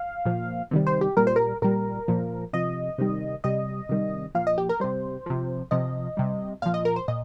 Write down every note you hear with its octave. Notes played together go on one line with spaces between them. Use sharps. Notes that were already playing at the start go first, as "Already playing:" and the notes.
Already playing: F5
A#2 F3
C3 D#3 G3
C5
G4
A#2 G3 A#4
C5
A#4
A#2 G3 A#4
A#2 F3
C3 F3 D#5
C3 D#3 G3
C3 G3 D#5
C3 D#3 G3
A#2 F3 F5
D#5
G4
A#4
C3 G3 C5
C3 F3
C3 F3 D#5
C3 G3
A#2 F3 F5
D#5
A#4
C5
A#2 D#5